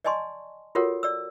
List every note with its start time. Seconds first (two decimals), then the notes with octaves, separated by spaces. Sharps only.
0.04 D5 D#5 G#5 A5 C6 C#6
0.75 F4 F#4 A4 A#4 C#5 F#5
1.03 D5 E6